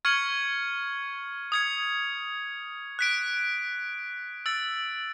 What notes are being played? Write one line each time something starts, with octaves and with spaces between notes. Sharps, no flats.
C#6 F6 G#6 C#7 F#7
D#6 G#6 C#7
F#6 B6 D7
E6 A6 D7